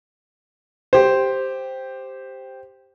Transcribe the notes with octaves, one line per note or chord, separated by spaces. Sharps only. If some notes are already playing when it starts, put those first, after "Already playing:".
G4 C5